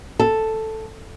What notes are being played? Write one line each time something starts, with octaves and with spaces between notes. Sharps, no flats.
A4